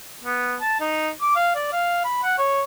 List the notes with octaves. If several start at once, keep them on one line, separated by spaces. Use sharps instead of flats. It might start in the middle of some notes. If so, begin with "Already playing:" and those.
B3
A5
D#4
D6
F5
D5
F5
B5
F#5
C#5